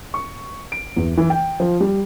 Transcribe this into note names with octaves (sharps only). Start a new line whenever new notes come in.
C#6
D7
E2
E3
G5
F3
G3